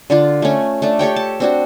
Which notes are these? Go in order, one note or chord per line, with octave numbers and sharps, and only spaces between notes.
D3 D4 F4
A3 C#4
A3 D4
G4 A4 C#5 G5
A5
C4 D4 F#4